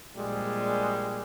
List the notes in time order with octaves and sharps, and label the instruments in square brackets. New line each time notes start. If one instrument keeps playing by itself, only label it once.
[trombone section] A#1 A#2 G3 G#3